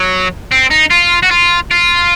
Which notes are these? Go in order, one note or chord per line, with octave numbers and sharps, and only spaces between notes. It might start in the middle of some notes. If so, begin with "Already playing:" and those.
Already playing: F#3
C4
D#4
F4
F#4
F4
F4